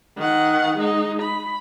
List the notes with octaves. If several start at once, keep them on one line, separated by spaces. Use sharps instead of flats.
D#3 F#5
G#3 D#4
B5